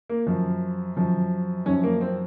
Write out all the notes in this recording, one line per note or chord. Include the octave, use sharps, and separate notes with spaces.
A#3
F#2 F3
F#2 F3
F#2 F3 C#4
A#3
C4